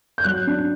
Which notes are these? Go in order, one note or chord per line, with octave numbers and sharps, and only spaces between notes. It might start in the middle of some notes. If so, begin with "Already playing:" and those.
G6
F#3 F#6
D4